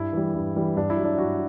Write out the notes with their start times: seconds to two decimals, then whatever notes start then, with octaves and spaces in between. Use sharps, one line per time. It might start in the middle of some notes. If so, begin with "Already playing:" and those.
Already playing: G2 E4
0.13 E3 G3
0.35 G2
0.56 E3 G3
0.76 G2 D4
0.90 E4
0.97 F#3
1.04 D4
1.18 G2 F#4